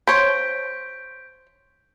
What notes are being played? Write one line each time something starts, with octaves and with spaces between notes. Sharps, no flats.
C5 C#5 G6 B6 D7